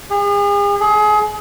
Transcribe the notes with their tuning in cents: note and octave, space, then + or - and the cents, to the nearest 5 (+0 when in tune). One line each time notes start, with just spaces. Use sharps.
G#4 -40
G#4 +30